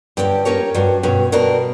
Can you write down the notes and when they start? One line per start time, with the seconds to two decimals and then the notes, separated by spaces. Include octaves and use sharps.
0.17 G2 D3 G3 C#4 G4
0.45 A#3 C#4 G4 A#4 C#5
0.74 G2 G3 C#4 F#4
1.03 G2 B2 F#3 C#4
1.32 B2 G3 B3 D4 A#4